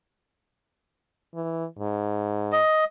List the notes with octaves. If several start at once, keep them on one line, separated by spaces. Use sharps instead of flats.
E3
G#2
D#5